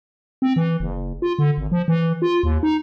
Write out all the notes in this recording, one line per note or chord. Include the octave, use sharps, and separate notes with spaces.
C4
E3
F#1
F4
D3
G#1
F3
E3
F4
D#2
D#4